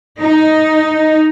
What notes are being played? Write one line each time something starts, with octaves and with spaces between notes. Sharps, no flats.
D#4